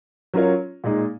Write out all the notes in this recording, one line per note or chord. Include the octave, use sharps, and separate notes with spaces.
F#3 C#4 F4 A#4 C#5
A#2 G#3 D#4